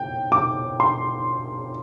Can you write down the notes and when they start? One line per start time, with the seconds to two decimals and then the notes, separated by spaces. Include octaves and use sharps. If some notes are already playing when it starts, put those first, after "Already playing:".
Already playing: G5
0.32 D6
0.80 C6